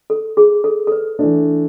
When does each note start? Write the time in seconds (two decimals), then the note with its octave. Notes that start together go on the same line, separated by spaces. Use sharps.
0.10 A4
0.37 G#4
0.64 A4
0.87 A4
0.92 B4
1.19 E3 A3 D4